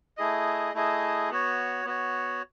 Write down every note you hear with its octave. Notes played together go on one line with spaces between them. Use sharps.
A3 E4 G#4 D#5
A3 E4 G#4 D#5
B3 F#4 C#5
B3 F#4 C#5